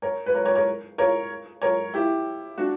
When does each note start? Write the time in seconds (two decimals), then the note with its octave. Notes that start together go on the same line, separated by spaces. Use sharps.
0.02 A#4 C#5
0.26 B4
0.34 A#4 C#5
0.45 A#4 C#5
0.55 A#4 C#5
0.98 A#4 C#5
1.62 A#4 C#5
1.94 E4 G4
2.58 D4 F#4